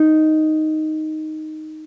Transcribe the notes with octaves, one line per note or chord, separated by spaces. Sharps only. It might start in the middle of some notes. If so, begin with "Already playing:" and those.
Already playing: D#4